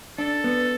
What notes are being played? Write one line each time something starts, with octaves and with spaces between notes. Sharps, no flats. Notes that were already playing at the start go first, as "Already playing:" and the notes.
D4 A4
B3